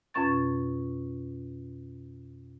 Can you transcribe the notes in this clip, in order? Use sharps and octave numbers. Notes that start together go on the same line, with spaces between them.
F2 B2 C#4 C#6 A6